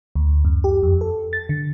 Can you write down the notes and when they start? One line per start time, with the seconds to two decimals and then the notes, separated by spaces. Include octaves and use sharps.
0.15 D2
0.45 F#2
0.64 G4
0.83 F2
1.01 A4
1.33 A6
1.49 D3